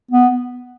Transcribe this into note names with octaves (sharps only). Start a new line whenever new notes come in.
B3